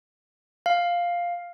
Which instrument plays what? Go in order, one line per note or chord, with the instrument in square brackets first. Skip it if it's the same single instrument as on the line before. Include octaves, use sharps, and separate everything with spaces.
[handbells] F5